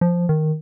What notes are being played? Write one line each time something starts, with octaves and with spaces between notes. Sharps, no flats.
F3
D#3